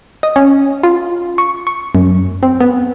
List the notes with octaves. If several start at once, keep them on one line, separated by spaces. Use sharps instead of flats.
D#5
C#4
F4
C#6
C#6
F#2
C4
B3